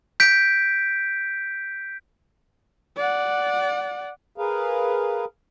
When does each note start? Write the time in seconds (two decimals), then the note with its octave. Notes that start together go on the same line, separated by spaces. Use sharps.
0.20 G6 B6 D7
2.97 D5 F#5
4.38 G#4 A#4 B4 F5